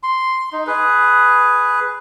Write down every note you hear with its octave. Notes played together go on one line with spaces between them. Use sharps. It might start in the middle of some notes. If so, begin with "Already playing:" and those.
C6
D#4
G#4 B4